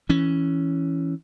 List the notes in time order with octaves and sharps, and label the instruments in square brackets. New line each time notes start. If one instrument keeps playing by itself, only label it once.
[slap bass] E3 C#4